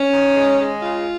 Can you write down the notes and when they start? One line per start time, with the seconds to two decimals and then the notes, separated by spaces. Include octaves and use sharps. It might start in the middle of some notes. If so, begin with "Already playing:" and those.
Already playing: C#4
0.12 D#3
0.36 G#3
0.59 G#3
0.82 C#3 F4